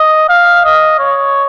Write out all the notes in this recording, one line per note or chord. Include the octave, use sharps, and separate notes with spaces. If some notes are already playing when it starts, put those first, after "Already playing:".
Already playing: D#5
F5
D#5
C#5